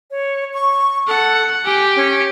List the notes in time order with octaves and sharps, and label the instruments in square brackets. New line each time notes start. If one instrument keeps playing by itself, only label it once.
[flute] C#5
C#6
[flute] A4 [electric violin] F#5
[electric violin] G4 G5 [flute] G#5
[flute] C#4